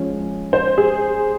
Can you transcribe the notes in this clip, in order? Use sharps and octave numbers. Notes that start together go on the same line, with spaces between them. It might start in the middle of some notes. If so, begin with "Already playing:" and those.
Already playing: F3 G#3 C#4
C5
G#4